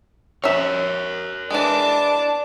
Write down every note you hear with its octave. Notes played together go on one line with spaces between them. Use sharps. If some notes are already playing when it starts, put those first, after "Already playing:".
C#4 A#4 C#5 E5
E3 G#3 D4 A5 D6